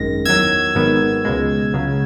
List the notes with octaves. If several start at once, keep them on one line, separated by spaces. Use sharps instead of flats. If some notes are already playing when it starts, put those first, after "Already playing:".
Already playing: G#1 F#2 D#3 G#3 A#6
E2 D#3 F#3 E6 G#6
G#1 G#2 D#3 F#3 B3
C#2 B2 G#3
C#2 C#3 F#3